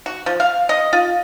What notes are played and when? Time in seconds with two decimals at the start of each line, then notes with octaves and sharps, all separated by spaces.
0.06 F#4
0.26 F3
0.40 F5
0.69 D#5
0.93 F4